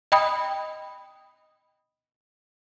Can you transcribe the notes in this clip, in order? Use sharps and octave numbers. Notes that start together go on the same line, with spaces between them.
D#5 G5 B5 D#6